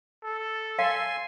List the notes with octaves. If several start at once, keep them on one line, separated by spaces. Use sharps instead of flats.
A4
F5 G#5 C6